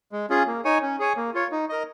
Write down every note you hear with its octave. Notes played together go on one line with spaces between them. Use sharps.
G#3
C#4 F4 G#4
A#3
D#4 C#5 G#5
C#4
G#4 C#5 G#5
A#3
F4 C#5
D#4
A#4 D#5